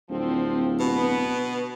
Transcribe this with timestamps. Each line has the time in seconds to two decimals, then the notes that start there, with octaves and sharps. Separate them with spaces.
0.10 D1 D3 F3 C4
0.80 B2 B3 B4